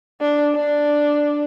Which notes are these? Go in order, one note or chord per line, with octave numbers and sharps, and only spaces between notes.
D4
D4